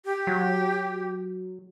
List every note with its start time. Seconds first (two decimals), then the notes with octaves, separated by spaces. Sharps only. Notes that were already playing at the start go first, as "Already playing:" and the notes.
0.05 G4
0.27 F#3